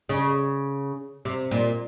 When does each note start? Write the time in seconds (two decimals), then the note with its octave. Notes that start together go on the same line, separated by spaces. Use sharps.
0.09 C#3
1.25 C3
1.51 A#2